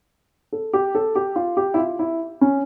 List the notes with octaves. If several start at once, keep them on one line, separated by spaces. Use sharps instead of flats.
A4
G4
A4
G4
F4
G4
E4
F4
E4
C#4